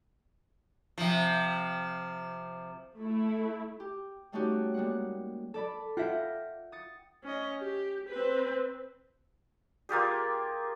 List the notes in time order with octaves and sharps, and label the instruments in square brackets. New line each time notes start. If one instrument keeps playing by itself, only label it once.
[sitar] C3 F3
[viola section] A3 E4
[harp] G4
G3 A3 C#4 D#4 F#4 G4
G3 G#3 A#3 F#5
A4 D5 B5
[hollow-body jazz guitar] F4 E5 [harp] F#5 G5 A#6
[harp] D#6 A6 C#7
[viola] C#4 D#5
G4
C4 B4
[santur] A#3 F4 G4 G#4